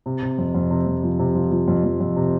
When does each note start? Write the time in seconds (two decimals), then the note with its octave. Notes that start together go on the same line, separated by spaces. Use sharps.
0.06 C3
0.22 C3
0.38 F2
0.55 F2
0.71 C3
0.87 F2
1.03 F3
1.19 C3
1.35 F3
1.51 F3
1.68 F2
1.84 F2
2.01 F2
2.16 C3